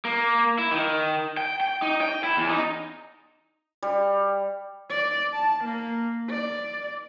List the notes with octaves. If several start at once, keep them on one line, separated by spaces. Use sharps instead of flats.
A#3
E4
D#3
G5
G5
D#4
G5
E4
E2
D#4
G3
D5
A5
A#3
D5